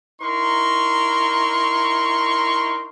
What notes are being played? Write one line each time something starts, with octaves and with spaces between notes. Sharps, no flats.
D#4 E4 A#4 C6 C#6